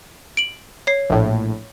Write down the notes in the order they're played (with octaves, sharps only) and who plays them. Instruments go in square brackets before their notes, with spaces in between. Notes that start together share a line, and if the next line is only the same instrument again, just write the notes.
[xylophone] D7 F#7
C#5 C7
[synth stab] A#1 A2